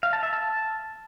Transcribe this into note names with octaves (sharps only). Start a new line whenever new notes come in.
F5
A5
E5
A5